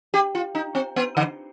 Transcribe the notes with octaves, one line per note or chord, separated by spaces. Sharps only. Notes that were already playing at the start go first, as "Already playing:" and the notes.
G4
F4
D#4
C4
B3
D3